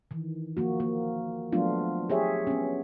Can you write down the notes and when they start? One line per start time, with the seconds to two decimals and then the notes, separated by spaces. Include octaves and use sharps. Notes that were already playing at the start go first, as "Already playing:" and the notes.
0.11 D#3 E3
0.57 F3 A#3 F#4
0.80 A#3
1.52 F3 F#3 A3 B3 D4 F4
2.10 G4 G#4 C#5 E5
2.47 B3 C#4